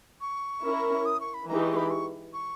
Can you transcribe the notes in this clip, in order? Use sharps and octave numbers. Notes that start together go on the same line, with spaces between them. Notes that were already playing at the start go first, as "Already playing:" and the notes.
C#6
C#4 E4 A#4
D#6
C#6
B5
E3 G#3 D#4 G4 A#5
C#6
C#6
B5
C#6
C#6